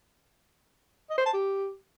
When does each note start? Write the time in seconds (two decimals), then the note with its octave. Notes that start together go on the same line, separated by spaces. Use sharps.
1.10 D#5
1.18 C5
1.25 A5
1.33 G4